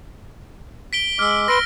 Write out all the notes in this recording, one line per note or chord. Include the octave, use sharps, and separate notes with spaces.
B6 D7 G7
G#3 D6 E6 F6
B4 C6 E6 A#6 D7 G7